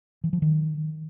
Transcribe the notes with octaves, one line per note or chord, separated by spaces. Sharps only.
E3
F3
D#3